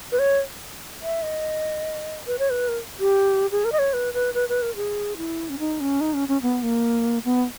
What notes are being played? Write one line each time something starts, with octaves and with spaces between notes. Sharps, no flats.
B4
C#5
E5
D#5
B4
C#5
B4
A#4
G4
G#4
A#4
D#5
C#5
B4
B4
B4
B4
A#4
G#4
E4
C#4
D#4
C#4
D#4
C#4
C#4
B3
A#3
B3